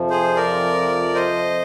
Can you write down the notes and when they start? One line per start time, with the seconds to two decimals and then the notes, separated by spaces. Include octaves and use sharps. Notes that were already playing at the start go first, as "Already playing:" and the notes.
Already playing: F2 C3 F3
0.10 G#4 C5
0.36 A#4 D5
1.15 C5 D#5